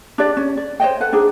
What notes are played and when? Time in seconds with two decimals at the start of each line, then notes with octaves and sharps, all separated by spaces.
0.18 D4 G4 D5
0.37 C#4
0.57 D5
0.80 C5 C#5 D#5 G5
1.00 A4 B4 F#5
1.13 D4 D#4 G#4